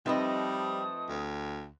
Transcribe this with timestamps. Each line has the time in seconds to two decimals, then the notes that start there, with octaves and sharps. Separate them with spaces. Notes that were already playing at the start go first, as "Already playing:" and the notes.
0.06 F3 G3 A3 C4 D#4 B4 D#5 D#6
1.09 D2